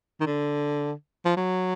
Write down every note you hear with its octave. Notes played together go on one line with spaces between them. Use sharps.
D#3
D3
F3
F#3